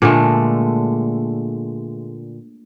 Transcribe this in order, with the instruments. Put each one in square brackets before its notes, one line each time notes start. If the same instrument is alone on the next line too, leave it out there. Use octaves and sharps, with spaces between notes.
[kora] A#2 D3 G#3 A3